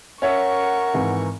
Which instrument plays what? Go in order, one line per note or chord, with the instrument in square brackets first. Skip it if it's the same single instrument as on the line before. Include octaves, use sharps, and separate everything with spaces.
[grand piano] C#4 C#5 E5 [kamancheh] A#4 C#6 [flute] F#5
[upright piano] G#1 G#2 E3